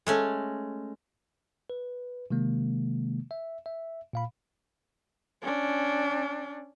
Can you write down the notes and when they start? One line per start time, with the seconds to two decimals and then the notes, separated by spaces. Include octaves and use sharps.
0.07 G#3 A3 C#4
1.70 B4
2.31 C3 D#3 G#3 A#3
3.31 E5
3.66 E5
4.13 A#2 F5 B5
5.42 C#4 D4